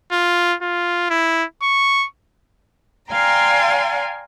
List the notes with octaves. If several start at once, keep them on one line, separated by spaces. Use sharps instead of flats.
F4
F4
E4
C#6
D5 F5 G5 G#5 A#5 C6